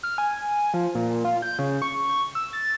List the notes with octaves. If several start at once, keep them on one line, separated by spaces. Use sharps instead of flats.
F6
G#5
F3
A#2
F4
G6
C#3
C#6
E6
A6